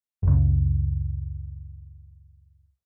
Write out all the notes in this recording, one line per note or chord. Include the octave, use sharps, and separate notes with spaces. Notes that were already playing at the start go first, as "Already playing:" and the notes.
F#1 C#2